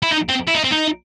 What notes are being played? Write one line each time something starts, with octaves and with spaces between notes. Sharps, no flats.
E4
D#4
C4
E4
D#4
C4
D#4